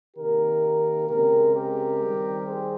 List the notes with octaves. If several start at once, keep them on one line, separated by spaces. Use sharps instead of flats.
C3 D#3 A#3 G4 A#4
C#3 G#3 C4 G4 A#4
G4 A#4
D#3 G3 C4
G#4 C5